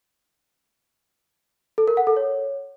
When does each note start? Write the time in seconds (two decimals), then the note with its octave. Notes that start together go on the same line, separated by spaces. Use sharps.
1.78 A4
1.88 A#4
1.97 F#5
2.07 A4
2.17 C#5